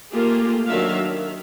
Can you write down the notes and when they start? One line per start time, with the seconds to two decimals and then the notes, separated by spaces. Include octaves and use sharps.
0.12 A3 A#3 F4 G4 G#4
0.67 D#3 F#3 D4 E5 F5
1.07 D#3